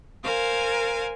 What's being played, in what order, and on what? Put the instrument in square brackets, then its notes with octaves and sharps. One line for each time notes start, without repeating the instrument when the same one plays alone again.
[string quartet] A#4 C5 F5 G#5